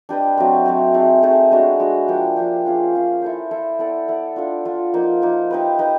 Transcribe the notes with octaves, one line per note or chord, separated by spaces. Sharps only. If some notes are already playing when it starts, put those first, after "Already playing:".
D4 G4 B4 D#5
F#3 A3 C4
F#3 A3 C4
A3 C4 D#4 G#4
A3 C4 D#4 G#4
G#3 B3 D4 F#4
G#3 B3 D4 F#4
F3 A#3 D4 G4
F3 A#3 D4 G4
C#4 F4 G#4
C#4 F4 G#4
E4 A4 C5
E4 A4 C5
B3 E4 A4 D5
B3 E4 A4 D5
D4 F4 A4
D4 F4 A4
F3 A#3 D#4
F3 A#3 D#4
D#4 G4 B4
D#4 G4 B4